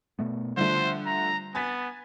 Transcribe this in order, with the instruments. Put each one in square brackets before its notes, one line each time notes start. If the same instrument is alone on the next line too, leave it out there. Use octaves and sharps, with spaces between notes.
[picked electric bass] B2 A3 B3
[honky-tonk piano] D3 F3 A3 [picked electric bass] G3 D4 [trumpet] C5
[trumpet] A#5
[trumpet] B3 [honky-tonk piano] G#5 A6 B6